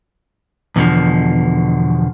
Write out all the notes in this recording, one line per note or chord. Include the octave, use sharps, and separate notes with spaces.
E2 B2 D3 D#3 F3